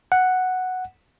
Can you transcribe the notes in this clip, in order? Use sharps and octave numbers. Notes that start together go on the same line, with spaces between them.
F#5